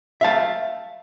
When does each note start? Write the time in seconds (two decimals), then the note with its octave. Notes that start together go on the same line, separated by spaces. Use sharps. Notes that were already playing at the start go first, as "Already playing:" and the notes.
0.21 E5 F5 A5